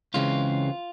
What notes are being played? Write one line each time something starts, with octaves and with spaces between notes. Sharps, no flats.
C#2 C#3 E3 G#3 C4 F4